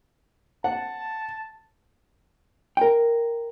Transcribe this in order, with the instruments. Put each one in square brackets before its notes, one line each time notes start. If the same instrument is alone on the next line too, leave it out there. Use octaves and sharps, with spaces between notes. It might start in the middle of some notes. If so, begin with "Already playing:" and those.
[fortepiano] F#5 [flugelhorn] A5
[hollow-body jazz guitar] A#4 G5